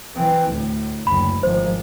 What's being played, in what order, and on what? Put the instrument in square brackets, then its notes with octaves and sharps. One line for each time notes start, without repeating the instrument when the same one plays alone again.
[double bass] E3 C4
D2 A2
[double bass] F#1 D2 [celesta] B5
[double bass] G#1 F3 [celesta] C5